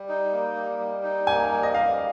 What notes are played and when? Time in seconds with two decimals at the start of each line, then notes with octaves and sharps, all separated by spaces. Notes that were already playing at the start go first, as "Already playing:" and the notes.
Already playing: G3
0.09 D#4
0.33 A#3
0.56 G3
0.79 G3
1.03 D#4
1.27 A#3 G#5
1.51 G3
1.63 D#5
1.74 G3 F5